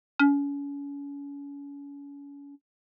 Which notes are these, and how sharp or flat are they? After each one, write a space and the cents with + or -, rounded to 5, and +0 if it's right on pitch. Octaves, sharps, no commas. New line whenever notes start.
C#4 +35